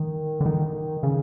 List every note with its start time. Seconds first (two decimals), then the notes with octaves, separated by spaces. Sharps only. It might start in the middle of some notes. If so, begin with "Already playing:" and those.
Already playing: D#3
0.41 D3
0.46 D#3
1.03 C#3